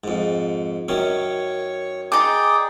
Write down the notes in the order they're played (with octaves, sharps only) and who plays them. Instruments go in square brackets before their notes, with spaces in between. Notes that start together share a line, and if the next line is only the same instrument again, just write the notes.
[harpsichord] F2 G#2
[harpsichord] F#2 D#3 C#4 [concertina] C#5
[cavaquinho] D#4 D6 [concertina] G#4 D5 G5